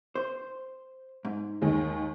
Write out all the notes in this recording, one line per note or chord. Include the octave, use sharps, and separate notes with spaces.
C5
G#2
D#2 D#3 G#3